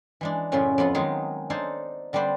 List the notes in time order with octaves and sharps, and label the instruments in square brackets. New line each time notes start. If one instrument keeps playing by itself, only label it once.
[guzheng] E3 G#3 D4
F#2 A2 C#3 C#4 E4 F4
F2 B3 F4 F#5
D#3 F#3 G#3 D#4 G#4 F5
D4 D#4 A4 C5 F5 G#5
D3 G3 B3 D4 C5